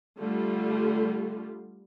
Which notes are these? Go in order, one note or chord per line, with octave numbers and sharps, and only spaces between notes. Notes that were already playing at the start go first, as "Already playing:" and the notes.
D3 G3 A3 F4